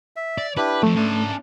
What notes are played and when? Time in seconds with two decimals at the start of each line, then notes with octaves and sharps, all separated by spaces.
0.16 E5
0.38 D5
0.57 D4 E4 G4 B4
0.83 F2 A3
0.96 C#4 D4 E5 A5